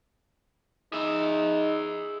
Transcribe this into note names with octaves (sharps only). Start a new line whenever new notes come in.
D#4 G#4 E5